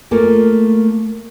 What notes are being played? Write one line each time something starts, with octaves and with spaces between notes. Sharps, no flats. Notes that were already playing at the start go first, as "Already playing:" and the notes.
A3 A#3 F4